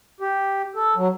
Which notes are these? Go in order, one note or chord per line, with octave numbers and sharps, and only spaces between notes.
G4
A4
F#3